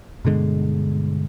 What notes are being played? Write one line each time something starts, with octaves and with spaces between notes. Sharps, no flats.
G2 B2 D3 G#3